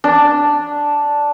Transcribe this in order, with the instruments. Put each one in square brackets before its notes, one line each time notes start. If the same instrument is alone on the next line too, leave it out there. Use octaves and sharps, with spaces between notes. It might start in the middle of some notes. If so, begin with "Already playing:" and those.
[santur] D4